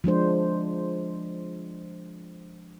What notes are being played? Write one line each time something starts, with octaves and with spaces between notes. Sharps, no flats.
F3 G#3 D4 C5